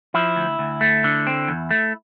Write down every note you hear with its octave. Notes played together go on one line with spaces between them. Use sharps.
F3 E4
D2
D2
A3
D3
C4
E2
A3